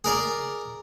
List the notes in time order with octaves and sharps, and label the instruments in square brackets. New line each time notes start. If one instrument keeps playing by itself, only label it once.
[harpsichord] G#4 A#4 D5